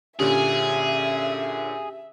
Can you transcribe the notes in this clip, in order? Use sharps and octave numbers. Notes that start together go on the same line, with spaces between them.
A#2 D3 C#4 G4 G#4 E5